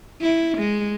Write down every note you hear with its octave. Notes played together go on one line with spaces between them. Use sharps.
E4
G#3